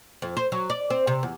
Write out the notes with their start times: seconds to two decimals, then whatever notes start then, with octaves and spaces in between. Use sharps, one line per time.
0.22 F2
0.37 C5
0.52 F#3
0.70 D5
0.90 C4
1.07 C3
1.23 E2